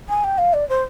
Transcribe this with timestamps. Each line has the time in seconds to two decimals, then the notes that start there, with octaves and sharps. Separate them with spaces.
0.08 G#5
0.23 G5
0.38 F5
0.53 D5
0.69 C5